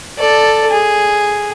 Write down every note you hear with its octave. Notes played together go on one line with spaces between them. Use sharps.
A4 D5
G#4